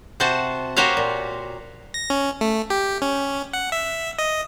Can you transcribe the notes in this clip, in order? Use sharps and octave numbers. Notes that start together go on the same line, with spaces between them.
C3 F#4 C5 F#5 A5
F#4 G4 A#4 C5 C#5 F5
A#2
A#6
C#4
A3
G4
C#4
F#5
E5
D#5